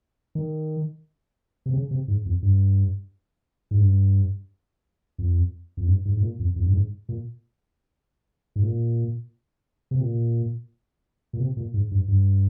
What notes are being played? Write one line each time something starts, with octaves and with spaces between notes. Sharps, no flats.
D#3
C3
C#3
C3
G#2
F2
G2
G#2
G2
F2
F2
G2
G#2
G#2
A#2
F2
F2
G2
G#2
A#2
G#2
A#2
C3
A#2
A#2
C3
A#2
G#2
G2
G2